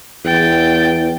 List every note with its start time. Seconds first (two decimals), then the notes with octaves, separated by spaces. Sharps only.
0.25 E2 G5 A6